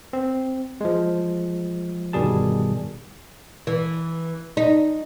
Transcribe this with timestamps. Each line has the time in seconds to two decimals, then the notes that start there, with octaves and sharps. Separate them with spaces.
0.13 C4
0.81 F3 G#3
2.13 G1 B2 D#3 G3 G#4 A5
3.67 E3
4.57 D#4